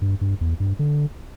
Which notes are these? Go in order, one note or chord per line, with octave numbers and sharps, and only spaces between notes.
G2
G2
E2
G2
D3